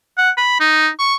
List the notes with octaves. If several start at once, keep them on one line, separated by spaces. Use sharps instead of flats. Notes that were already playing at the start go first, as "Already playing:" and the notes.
F#5
B5
D#4
C#6